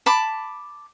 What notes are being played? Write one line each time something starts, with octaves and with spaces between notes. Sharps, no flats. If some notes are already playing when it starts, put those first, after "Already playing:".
A5 B5 D6